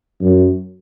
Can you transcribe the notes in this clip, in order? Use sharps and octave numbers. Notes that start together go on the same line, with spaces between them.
F#2